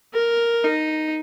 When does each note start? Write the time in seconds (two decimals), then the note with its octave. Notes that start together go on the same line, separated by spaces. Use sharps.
0.14 A#4
0.64 D#4